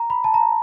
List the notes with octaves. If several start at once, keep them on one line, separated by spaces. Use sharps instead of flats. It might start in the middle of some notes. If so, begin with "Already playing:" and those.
Already playing: A#5
B5
A5
A#5